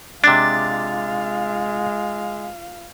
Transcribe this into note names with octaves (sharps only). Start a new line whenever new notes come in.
C3 G#3 D4 F4 F5 A6